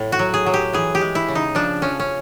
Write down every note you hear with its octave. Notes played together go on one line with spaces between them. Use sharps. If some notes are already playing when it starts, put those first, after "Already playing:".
Already playing: A2
F#4
F#3
G#4
F#3
G4
E3 G#4
G4
G#3
E4
C#3
D#4
F3 D4
F3 C#4
C#4